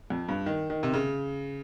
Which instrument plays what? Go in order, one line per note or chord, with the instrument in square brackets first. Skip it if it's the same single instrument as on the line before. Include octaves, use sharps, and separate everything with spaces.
[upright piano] F2
G2
D#3
D#3
C3
C#3